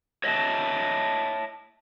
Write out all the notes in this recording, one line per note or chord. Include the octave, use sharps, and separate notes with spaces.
C#5 D#5 E5 G5 A5